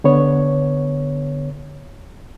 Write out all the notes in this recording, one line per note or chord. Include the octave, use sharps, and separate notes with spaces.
D3 B3 C#5